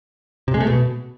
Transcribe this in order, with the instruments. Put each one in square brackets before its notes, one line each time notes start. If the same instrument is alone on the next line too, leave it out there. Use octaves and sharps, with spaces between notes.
[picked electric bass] C3
G#3
A3
B2